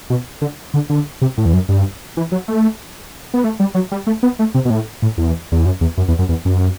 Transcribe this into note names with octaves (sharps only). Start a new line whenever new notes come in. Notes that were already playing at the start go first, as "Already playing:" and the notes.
B2
D3
D3
D3
C3
A2
E2
F#2
G2
E3
F#3
A3
B3
A3
G3
F#3
G3
A3
B3
A3
C3
B2
A2
A2
E2
E2
F#2
E2
F#2
E2
F#2
E2
F#2